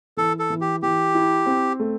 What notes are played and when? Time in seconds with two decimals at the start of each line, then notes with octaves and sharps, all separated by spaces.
0.17 E3 A4
0.39 A4
0.50 E3
0.61 G4
0.82 E3 G4
1.15 E4
1.46 C4
1.79 A3